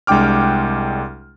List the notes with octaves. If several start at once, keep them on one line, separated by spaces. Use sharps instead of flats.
C2 G#3 D4 G5 D6 F6